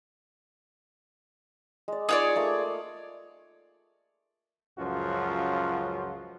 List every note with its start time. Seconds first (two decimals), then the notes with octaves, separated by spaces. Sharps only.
1.88 G#3 D5
2.09 D#4 F4 G#4 C#5 D5 E6
2.36 A3 A#3 D6
4.79 C#2 F#2 F3 F4 F#4